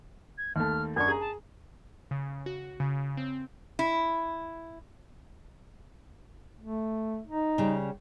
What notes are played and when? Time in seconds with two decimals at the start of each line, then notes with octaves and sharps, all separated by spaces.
0.38 G#6
0.56 D#2 A3 F6
0.96 F#2 D4 C#6 G#6
1.08 G#4 A#5
1.21 A5
2.11 C#3
2.46 F#4
2.80 C#3
3.17 C4
3.79 E4
6.61 A3
7.27 D#4
7.58 C#3 G3